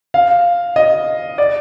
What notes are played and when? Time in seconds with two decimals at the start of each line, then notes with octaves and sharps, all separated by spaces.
0.14 F5
0.76 D#5
1.38 D5